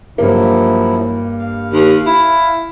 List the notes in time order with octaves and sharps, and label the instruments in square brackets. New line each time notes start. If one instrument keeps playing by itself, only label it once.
[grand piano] G2 A#3 [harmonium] F3 F#3 E4
[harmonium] F5
[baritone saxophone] D#2
E4